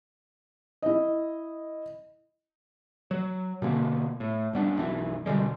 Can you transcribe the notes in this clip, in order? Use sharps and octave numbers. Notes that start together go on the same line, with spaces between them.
E4 D#5
F#3
B2 D3 A#3 B3
A2
F#1 G3 B3 D4
B1 F#2 E3
B2 D3 G3 G#3